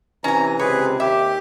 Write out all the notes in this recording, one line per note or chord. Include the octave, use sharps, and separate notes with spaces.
C3 E3 C#4 G#5 A#5
C#2 C3 G#4 B4 C#5
D#2 G4 E5